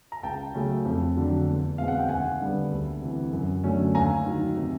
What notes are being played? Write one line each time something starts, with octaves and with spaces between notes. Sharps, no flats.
A#5
C#2 G5 A5
C#3 F#3 A3 C#4
F2
D3 F#3
E2
B2 G#3 C4 F5
F#5
G5
D#2 F#5 G#5
D3 G3 B3
D2
C3 E3
F#2
D3 F#3 A3 C#4
D#2 G#5 A#5
D#3 F#3
C3